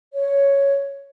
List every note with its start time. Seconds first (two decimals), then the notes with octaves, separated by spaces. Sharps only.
0.14 C#5